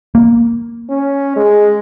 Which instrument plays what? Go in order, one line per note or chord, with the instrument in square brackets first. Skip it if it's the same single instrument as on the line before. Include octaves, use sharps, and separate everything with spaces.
[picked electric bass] A#3
[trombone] C#4
G#3